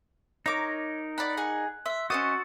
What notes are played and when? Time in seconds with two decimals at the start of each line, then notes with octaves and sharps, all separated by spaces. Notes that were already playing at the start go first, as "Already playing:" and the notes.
0.46 D#4 A#4 C#5 D6
1.18 D5 F#5 B5 F#6
1.37 G#4 F#5
1.86 E5 C6 E6
2.10 C#4 F#4 C5 D#5 D#6 A6 C#7